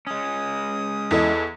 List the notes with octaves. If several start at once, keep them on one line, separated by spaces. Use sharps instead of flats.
G#3 C#4 D#6
E2 E4 A4 D#5